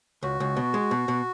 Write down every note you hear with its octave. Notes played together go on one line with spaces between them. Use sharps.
C#2 F#4
C#2
B2
G#3
B2
B2